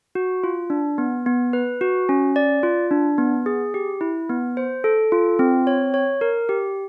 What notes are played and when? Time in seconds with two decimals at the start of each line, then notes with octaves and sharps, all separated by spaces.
0.15 F#4
0.44 F4
0.70 D4
0.98 B3
1.26 B3
1.53 B4
1.81 F#4
2.09 C#4
2.36 D5
2.63 F4
2.91 D4
3.18 B3
3.46 G#4
3.74 G4
4.01 E4
4.29 B3
4.57 C5
4.84 A4
5.12 F4
5.39 C4
5.67 C#5
5.94 C#5
6.21 A#4
6.49 G4